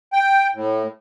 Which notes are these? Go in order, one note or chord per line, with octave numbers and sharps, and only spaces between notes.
G5
A2